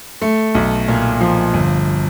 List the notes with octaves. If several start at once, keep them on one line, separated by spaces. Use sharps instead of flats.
A3
B1
A#2
F3
G1